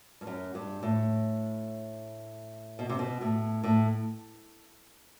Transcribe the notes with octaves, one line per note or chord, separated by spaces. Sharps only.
G2
F#2
G2
A2
B2
C3
B2
A2
A2